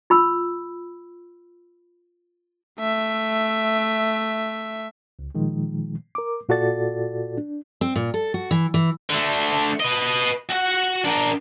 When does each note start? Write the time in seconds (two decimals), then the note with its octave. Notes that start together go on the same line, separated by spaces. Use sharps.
0.10 F4 B5 E6
2.80 A3 E5
5.19 C#2
5.35 A#2 D#3 F3 G#3
6.15 A#4 D6
6.49 A#2 F4 F#4 A4 D5 A6
7.37 D4
7.81 C4
7.95 A#2
8.14 A4
8.34 F#4
8.51 E3
8.74 E3
9.09 D3 A3
9.80 B4 D#5
10.50 F#4 F#5
11.04 D4 A#4